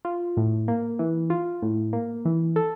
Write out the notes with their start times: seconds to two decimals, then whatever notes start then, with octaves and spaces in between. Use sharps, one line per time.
0.05 F4
0.37 A2
0.68 A#3
0.99 E3
1.30 F4
1.62 A2
1.93 A#3
2.25 E3
2.56 A4